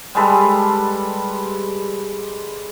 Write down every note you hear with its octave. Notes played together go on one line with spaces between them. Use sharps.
G3 G#3 A4 B4